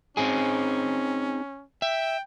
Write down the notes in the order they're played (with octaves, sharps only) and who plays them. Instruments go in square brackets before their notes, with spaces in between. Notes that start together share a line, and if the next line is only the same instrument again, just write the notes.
[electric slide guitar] C4 D#4 G#4 [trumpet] C#4
[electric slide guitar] E5 [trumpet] G5